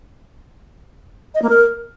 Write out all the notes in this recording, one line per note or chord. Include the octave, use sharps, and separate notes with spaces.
D#5
A#3
A#4